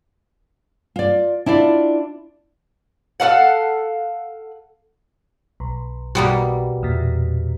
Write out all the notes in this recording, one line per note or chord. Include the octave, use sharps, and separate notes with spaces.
F4 D5
D4 E4 F4 D5
A4 A#4 F5 F#5
B1
B2 G3 A#3
E2 A#2